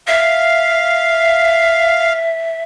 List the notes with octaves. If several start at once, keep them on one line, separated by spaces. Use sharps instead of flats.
E5 F5